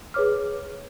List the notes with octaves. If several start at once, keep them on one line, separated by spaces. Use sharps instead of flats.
G#4 B4 C#5 D6 F6